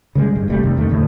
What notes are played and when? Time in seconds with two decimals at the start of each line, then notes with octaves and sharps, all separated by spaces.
0.15 C#3 G3 G#3
0.35 G2
0.48 F#1 C3 G3 A3
0.63 C3 D#3
0.77 E2 D#3 A3
0.89 D2 A2